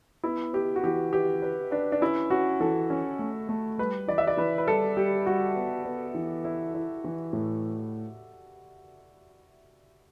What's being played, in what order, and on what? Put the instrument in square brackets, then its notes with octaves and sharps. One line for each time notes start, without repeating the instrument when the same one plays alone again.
[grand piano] B3 [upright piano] E4
[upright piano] G4 [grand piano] B4
[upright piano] F#4
[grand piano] E3 [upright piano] G4
[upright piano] G4 [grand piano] B4
[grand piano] B4
[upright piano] D4 [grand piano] B4
[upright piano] D4
[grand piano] C#4 [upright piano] E4
[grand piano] C#4 [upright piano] F#4
[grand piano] E3 [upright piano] A4
[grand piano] C#4
A3
A3
[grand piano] G3 [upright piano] B4
[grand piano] E3 [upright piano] D5
[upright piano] E5
D5
[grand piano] E3 [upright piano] B4
[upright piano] B4
[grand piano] G3 [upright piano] A4
[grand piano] G3 [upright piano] G4
[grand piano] G3 [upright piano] F#4
[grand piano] B3
B3
E3
E4
E4
E3
A2